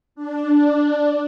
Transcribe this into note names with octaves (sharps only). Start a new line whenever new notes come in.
D4